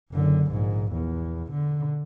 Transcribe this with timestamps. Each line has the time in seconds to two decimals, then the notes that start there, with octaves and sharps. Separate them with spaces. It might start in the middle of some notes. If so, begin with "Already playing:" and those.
0.12 F#1 D3
0.51 A#1 G#2
0.92 E2
1.51 D3